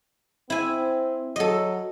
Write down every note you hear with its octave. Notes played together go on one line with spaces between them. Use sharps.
C4 E4 G#5
F#3 A4 D#5